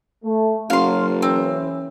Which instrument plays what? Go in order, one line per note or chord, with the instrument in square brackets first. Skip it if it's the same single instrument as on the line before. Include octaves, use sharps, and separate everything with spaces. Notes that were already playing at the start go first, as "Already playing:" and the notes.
[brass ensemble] A3
[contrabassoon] F#1 [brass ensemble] F#3 [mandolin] F5 C6
[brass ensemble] E3 C#4 [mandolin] C4